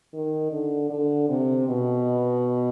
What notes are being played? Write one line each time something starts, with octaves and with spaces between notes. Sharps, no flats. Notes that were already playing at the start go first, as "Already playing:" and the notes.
D#3
D3
D3
C3
B2